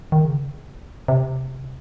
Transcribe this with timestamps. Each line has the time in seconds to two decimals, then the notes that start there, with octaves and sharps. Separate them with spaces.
0.12 D#3
0.25 C#3
1.08 C3